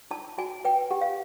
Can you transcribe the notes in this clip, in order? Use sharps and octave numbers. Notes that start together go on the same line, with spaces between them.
D#4 A5
F#4 G#5
B4 G5
G4 F#5
F5